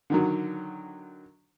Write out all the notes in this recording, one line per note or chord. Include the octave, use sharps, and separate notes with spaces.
D3 D#3 F#3